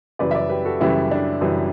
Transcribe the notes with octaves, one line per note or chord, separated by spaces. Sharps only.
F#2 C#3 E3 G3 B4 D5
E5
B4 D5
G4 B4
F#4 A4
F#2 C#3 E3 G3 E4 G4
D4
F#2 C#3 E3 G3